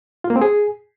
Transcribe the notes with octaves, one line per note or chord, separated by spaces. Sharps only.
F4
A#3
C4
G#4